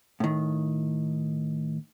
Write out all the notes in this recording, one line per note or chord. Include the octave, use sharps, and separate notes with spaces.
A2 D#3